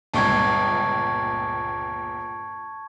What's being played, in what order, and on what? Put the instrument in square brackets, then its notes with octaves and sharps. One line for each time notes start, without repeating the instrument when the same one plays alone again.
[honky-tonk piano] G1 C#2 A#2 [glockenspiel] A5 C#6 G#6